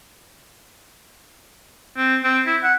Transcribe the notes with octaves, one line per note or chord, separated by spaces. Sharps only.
C4
C4
E4
F#5